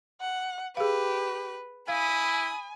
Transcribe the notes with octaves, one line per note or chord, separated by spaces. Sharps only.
F#5
G4 G#4 B4 F5
E4 F5 G#5 B5 D#6